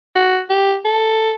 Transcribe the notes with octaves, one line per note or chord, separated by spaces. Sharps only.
F#4
G4
A4